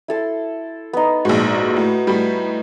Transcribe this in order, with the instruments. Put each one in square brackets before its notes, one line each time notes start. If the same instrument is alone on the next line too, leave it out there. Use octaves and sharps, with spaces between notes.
[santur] E4 A4 C6
B3 D#4
[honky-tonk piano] A#1 G#2 [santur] F#4
[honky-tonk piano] A2
A2 G3